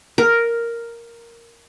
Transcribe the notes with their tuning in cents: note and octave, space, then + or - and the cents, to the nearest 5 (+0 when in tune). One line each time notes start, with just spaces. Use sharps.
A#4 +0